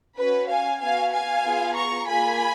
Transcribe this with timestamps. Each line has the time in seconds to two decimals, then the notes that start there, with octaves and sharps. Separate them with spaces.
0.17 C#4 F#4 B4
0.49 F5 G#5
0.81 B3 F#4 F5 G#5
1.12 F5 G#5
1.45 B3 F4 G#4
1.76 A#5 C#6
2.07 A#3 F4 G#4 G#5 B5